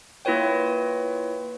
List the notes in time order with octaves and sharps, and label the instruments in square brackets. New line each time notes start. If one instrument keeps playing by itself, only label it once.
[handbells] A#3 E4 F4 B4 C#5 G5